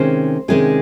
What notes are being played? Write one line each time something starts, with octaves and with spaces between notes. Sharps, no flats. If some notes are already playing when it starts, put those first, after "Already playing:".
Already playing: C3 D#3 G#3 C#4 C5
C3 D#3 G#3 C#4 G#4